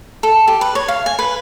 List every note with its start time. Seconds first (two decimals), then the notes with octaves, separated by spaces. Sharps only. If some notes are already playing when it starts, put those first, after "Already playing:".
0.23 A4
0.48 G4
0.61 B4
0.75 C#5
0.88 F5
1.06 G#5
1.19 B4